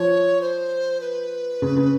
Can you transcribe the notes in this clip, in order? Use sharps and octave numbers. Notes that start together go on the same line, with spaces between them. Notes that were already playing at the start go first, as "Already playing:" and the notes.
Already playing: F3 C#5
C5
B4
C#3
C#3